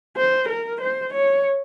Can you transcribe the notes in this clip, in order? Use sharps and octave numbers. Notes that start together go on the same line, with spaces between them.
C5
A#4
C5
C#5